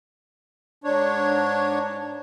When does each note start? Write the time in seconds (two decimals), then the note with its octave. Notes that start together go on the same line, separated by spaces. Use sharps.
0.84 G#2 D4 C#5